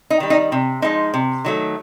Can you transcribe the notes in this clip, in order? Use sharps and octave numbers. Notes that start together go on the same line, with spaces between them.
D#4
D#3 G3
D#4
C3
F3 G#3 D#4
C3
D#3 F#3 A3